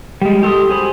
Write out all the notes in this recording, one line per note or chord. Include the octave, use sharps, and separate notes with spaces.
G3 G#3
G4 A4 C6 D6 D#6
F#4 G#4 C5 B5